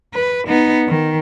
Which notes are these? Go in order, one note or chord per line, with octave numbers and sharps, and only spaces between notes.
B4
B3 D#4
D#3